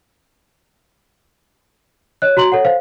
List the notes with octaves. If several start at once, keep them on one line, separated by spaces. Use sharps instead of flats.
C#5 D#5 F#6
F#4 A#5 C6 F#7
A4 C#5 F#5
C5 F5